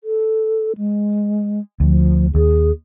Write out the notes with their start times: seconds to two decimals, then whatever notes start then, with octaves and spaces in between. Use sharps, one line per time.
0.04 A4
0.77 G#3
1.80 D2 F3
2.35 D#2 G#4